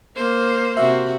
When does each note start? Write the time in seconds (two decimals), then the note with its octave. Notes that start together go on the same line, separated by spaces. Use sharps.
0.16 A#3 C5
0.77 C3 F#4 E5